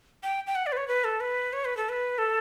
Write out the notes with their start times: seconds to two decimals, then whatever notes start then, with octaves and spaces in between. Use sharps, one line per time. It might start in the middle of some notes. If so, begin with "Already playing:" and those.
0.23 G5
0.47 G5
0.55 F#5
0.66 D5
0.72 B4
0.77 C#5
0.88 B4
1.04 A4
1.20 B4
1.53 C#5
1.65 B4
1.77 A4
1.89 B4
2.18 A4